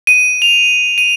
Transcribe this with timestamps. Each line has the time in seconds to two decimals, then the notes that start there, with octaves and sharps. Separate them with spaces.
0.07 D#7
0.42 F7
0.98 D#7